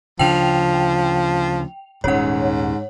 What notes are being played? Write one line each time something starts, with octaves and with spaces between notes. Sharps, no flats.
D2 C#3 F3 D4 G5 F7
D#1 G#2 C#4 C#5 F#5